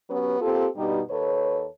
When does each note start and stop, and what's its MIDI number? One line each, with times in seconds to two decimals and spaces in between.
0.10 0.39 54
0.10 0.39 59
0.10 0.39 61
0.10 0.39 67
0.10 0.39 71
0.41 0.67 58
0.41 0.67 60
0.41 0.67 65
0.41 0.67 67
0.41 0.67 69
0.76 1.01 43
0.76 1.01 47
0.76 1.01 55
0.76 1.01 63
0.76 1.01 67
1.10 1.66 39
1.10 1.66 69
1.10 1.66 71
1.10 1.66 73